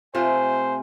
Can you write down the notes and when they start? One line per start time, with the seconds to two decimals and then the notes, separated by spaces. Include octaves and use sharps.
0.15 C3 A3 F4 C5 G#5